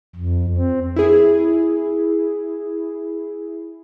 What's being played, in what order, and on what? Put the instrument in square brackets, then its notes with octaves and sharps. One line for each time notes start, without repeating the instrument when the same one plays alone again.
[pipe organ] F2
C4
[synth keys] E4 G#4